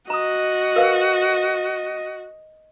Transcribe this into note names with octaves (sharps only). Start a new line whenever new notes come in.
F#4 D#5 A#5 D#6
A#4 B4 F5